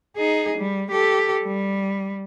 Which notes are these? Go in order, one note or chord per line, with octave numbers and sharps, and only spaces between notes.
D#4 G#4
G3
G4 A4
G3